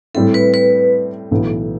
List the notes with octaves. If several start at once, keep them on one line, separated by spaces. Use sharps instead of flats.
A2 G3 C4 E4 A4
B4
B4
B1 A2 E3 B3